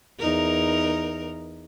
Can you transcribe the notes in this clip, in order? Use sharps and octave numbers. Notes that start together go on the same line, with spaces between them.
E2 D#4 A#4